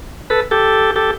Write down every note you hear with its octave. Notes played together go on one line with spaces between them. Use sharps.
A4 B4
G4 A4
G4 A4